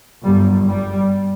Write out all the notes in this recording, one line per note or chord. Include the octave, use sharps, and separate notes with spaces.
G1 F#2 G3
G3